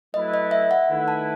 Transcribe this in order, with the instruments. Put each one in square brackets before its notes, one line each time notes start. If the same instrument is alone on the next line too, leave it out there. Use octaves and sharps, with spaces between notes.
[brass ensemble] F#3 A3 E4 B4 [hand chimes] D#5
[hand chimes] D#5
E5
F#5
[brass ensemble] D#3 A3 E4 B4
[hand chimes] A5